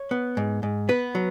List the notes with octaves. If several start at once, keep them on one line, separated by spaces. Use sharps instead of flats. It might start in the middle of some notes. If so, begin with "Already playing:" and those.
Already playing: C#5
B3
G#2
G#2
B3 B4
F#3